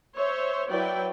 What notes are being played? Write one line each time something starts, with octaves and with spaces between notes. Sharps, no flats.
C5 C#5 E5
F#3 E4 B4 D5 G5